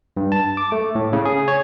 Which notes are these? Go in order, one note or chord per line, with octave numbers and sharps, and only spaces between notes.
G2
A5
D6
A3
A2
C#3
G#4
C#5